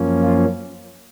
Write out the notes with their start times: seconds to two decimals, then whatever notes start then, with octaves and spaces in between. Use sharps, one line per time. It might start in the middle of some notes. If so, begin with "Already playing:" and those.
Already playing: F#2 F3 A#3 C#4
0.23 F4